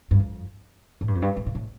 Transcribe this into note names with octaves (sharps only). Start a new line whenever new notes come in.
G2
F2
A2
G2
F2
G2
A2
A#2
A2